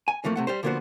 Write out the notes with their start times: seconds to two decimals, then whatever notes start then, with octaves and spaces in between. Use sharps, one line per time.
0.08 G#5
0.24 F2 E3 F3 A3 A#3
0.36 C3 A3 F#5
0.47 G3 G4 C5
0.63 D3 F3 A#3 B3 F#4 C5